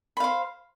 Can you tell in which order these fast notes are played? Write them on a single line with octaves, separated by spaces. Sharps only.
B5 F5 C5